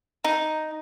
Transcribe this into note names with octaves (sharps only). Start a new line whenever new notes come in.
D#4